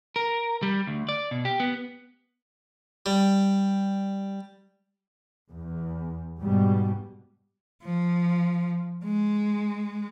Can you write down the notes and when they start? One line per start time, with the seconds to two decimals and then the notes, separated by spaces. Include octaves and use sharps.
0.16 A#4
0.63 G3
0.87 D2
1.09 D5
1.31 B2
1.45 G4
1.60 B3
3.06 G3
5.51 E2
6.40 G#2 B2 G3
7.83 F3
9.04 G#3